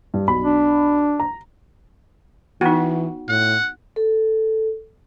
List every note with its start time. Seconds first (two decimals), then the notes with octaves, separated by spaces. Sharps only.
0.14 G2
0.28 B1 B5
0.44 D4
1.20 A#5
2.61 E3 B3 D#4 F#4
3.29 A2 F#5
3.96 A4